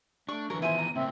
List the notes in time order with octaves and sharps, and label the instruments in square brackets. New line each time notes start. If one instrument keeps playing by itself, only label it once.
[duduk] A3 [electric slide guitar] D4 [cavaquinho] C#6
[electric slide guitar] D3 F#3 [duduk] E3 [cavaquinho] A#4 [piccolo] C#6
[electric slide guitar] D#3 F3 B3 [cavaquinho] E4 G#4 C5 [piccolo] D#7
[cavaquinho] A#5
[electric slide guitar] A2 C#3 A#3 [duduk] C4 [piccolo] E5